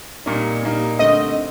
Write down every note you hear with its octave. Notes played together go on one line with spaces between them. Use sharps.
A#2 G3 A#3 D#4
A#2 G3 A#3 D#4
D3 A3 C4 D#5